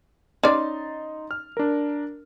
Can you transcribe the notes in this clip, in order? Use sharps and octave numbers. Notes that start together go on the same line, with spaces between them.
C#4 D#4 D5 C6 A6
F6
D4 A#4